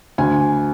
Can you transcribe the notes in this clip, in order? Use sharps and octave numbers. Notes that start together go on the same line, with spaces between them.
D2 G#5